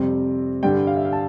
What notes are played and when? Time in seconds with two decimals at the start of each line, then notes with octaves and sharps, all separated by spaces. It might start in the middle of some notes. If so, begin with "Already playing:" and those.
Already playing: F2 C3 G3 C4
0.63 G2 D3 G3 G5
0.87 F5
0.97 E5
1.05 F5
1.13 A5